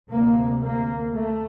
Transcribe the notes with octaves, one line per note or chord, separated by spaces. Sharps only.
D2 C3 A#3
A#3
A3